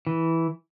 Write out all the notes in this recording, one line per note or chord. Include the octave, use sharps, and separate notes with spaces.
E3